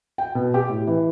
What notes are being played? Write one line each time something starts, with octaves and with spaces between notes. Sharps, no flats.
G5
B2
G4
A2
E3